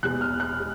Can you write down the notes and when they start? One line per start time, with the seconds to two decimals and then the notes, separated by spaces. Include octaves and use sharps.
0.03 E2 B2 G#3 F#6
0.21 F6
0.40 F#6
0.59 G#3